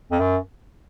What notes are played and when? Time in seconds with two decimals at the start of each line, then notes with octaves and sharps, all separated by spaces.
0.11 F2
0.20 F#2